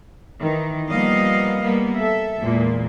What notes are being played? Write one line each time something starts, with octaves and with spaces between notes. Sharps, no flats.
D#3 E3
F3 G3 A#3 B3 D#5 F5
G3 A#3 B3
A4 E5
E2 A#2 G#3 A#3